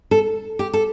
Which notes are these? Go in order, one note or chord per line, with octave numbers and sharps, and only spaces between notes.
A4
G4
A4